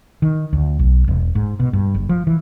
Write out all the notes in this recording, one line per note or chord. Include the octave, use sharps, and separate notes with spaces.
D#3
D2
B1
E1
G#2
B2
G2
F#1
F3
E3